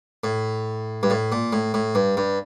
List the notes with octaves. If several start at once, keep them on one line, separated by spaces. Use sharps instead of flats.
A2
G2
A2
A#2
A2
A2
G2
G2